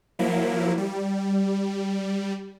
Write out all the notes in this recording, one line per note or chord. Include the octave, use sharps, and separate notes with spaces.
F3 F#3 A#3 E4
G3